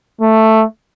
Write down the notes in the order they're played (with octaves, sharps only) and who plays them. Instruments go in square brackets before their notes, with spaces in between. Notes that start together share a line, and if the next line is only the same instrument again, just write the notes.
[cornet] A3